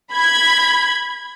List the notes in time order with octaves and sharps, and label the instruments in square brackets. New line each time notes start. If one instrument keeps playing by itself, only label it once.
[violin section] B5 G#6